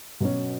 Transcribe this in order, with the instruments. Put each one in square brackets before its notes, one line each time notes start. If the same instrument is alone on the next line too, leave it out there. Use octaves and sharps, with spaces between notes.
[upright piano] B2 F#3 C#4